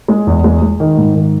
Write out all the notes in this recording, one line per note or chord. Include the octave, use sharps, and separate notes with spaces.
G#3
E2
G#3
G#3
D#3
G#2
D#3